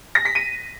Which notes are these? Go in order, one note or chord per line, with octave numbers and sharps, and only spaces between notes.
A#6
B6
D#7